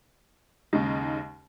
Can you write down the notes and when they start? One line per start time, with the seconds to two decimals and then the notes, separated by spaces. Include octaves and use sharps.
0.73 D#2 C#3 G#3 D#4